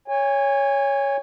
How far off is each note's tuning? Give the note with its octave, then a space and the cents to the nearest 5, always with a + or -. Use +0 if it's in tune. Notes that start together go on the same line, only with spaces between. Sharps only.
C#5 +5 G#5 -30